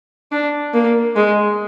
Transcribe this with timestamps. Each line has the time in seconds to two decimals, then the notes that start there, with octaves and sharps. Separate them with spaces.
0.32 D4
0.74 A#3
1.16 G#3